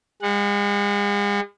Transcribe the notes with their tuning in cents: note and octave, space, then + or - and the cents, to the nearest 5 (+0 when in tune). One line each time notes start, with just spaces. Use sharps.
G#3 -40 F#5 -25